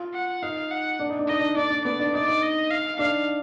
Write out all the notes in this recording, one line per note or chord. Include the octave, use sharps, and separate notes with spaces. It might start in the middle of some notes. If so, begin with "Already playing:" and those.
Already playing: F4
F#5
D#4 F5
F#5
D4
D#4
D4
D#4 D#5
D4
D4 D5
D4
B3 D5
D4
D#4 D5
D#4
D#5
F5
D4 F5